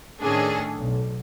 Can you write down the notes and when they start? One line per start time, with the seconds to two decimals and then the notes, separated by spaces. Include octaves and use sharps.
0.21 A2 D#3 C#4 D4 G#4 A4
0.77 B1